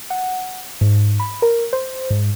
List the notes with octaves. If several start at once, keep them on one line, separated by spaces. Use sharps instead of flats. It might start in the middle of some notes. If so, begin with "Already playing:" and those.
F#5
G#2
B5
A#4
C5
G#2